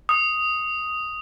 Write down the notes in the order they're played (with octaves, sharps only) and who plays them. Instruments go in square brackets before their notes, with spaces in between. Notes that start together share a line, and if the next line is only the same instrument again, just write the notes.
[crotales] D#6